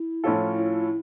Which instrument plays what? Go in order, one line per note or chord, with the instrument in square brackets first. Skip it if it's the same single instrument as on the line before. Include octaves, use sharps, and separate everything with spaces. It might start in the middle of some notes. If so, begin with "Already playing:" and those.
Already playing: [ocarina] E4
[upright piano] A2 F3 C#4 F4 A4
[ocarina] E4